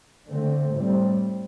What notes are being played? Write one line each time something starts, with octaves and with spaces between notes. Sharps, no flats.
D3 A3 C4
A2 G3 C4